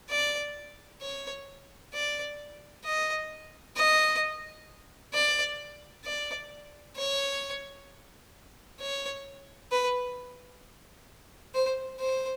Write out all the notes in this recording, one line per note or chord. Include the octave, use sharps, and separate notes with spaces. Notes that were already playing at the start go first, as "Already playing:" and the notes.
D5
C#5
D5
D#5
D#5
D5
D5
C#5
C#5
B4
C5
C5